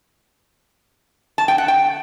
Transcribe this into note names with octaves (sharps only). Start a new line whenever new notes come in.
A5
G5
F#5
G5